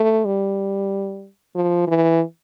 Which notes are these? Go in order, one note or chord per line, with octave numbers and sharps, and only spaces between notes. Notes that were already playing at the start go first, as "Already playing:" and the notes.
Already playing: A3
G3
F3
E3